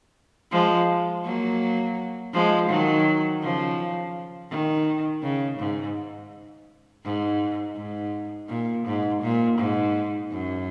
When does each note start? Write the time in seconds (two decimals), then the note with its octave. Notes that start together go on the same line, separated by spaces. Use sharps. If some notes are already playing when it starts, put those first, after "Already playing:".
0.52 F3 G#3
1.24 F#3 A#3
2.33 F3 G#3
2.69 D#3 F#3
3.42 C#3 F3
4.50 D#3
5.23 C#3
5.59 G#2
7.04 G#2
7.76 G#2
8.49 A#2
8.86 G#2
9.22 A#2
9.59 G#2
10.31 F#2